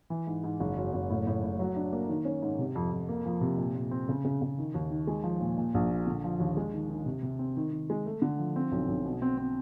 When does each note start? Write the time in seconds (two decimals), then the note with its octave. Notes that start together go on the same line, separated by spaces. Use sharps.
0.10 E3
0.27 G#2
0.44 G#2
0.60 F#1
0.77 F#2
0.94 F#1
1.10 A2
1.27 A2
1.44 A2
1.59 F#3
1.76 D4
1.93 A#3
2.09 D#3
2.25 C#4
2.42 G#2
2.59 C3
2.75 F2
2.92 F2
3.09 A#3
3.26 F3
3.41 C3
3.58 A#2
3.75 A#2
3.91 C4
4.09 C#3
4.25 C#3
4.42 C#3
4.58 D#3
4.74 D#2
4.90 D#3
5.07 G#3
5.24 F3
5.41 A#2
5.57 A#2
5.74 A#1
5.90 A#2
6.07 D3
6.24 F3
6.40 D#2
6.57 G#3
6.74 D#3
6.90 D#3
7.06 C3
7.23 C3
7.39 C4
7.57 D#3
7.72 D#3
7.90 G#3
8.06 A3
8.22 D3
8.39 F3
8.56 C4
8.71 B1
8.88 B1
9.05 B2
9.22 C4
9.38 C4